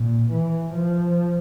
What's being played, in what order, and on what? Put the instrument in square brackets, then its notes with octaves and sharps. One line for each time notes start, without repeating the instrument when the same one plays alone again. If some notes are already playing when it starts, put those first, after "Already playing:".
Already playing: [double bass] A#2
E3
F3